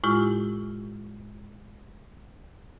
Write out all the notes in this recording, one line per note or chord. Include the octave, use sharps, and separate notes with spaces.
A2 G#3 E4 F4 G4